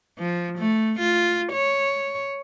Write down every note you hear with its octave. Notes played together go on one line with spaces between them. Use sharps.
F3
A3
F4
C#5